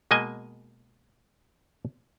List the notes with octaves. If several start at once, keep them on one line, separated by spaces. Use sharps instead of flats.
B2 G#3 A#3 D#5 G#5